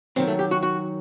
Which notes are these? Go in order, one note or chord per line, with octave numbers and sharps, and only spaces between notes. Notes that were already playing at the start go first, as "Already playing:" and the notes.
F#2 D#3 F#3 C4
A3
G4
F#4
F#4